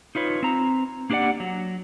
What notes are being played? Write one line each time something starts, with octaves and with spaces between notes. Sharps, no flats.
D#4 F4 B4 C#5
C4 A#5
A#3 D4 G4 G#4 D5 F#5
F#3